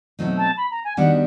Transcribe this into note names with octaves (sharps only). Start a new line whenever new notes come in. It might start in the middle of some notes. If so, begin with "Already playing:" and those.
B2 F#3 A3 C4 D#4
A5
B5
A#5
G#5
D#3 G3 B3 D4 F#4 F#5